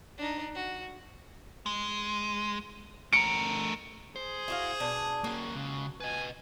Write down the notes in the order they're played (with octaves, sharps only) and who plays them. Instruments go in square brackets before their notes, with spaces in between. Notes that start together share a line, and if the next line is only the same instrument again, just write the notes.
[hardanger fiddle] D4 D#4
F#4
[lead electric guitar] G#3
[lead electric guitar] A3 A#4 [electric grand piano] C#7 D7
[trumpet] G#4 [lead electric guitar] C5
[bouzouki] E4 F#4 F5
B2 D4
[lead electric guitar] A#3 C#4 [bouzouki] F#4
[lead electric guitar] C#2 C#3
[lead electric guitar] B4 D#5 [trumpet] G#5